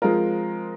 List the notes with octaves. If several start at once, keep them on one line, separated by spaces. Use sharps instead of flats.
F3 G#3 C4 F4 A#4